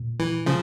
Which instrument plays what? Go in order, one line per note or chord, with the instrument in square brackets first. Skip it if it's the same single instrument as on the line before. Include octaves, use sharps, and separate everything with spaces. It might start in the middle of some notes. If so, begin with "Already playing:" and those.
Already playing: [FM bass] A#2
[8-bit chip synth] E3
C#3 F3